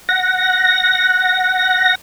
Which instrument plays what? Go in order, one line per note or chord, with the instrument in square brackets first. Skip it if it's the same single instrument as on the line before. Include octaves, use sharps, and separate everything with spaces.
[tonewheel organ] F#5 A#6